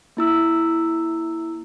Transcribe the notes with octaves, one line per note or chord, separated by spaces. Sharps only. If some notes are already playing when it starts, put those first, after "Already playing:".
A#3 E4 E6